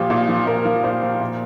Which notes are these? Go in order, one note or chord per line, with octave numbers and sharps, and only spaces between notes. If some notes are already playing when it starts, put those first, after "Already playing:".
Already playing: A#2 F3 G4
A#2
F3
A#2 A#4
F3
A#2 C5
F3
A#2